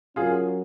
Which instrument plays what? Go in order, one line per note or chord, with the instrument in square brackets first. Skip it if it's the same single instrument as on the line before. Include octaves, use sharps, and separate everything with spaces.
[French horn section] F#3 C#4 F#4 A#4 [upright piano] F4 G#4